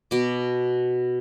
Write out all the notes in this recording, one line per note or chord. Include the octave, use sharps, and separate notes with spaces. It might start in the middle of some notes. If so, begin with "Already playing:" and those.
B2 D6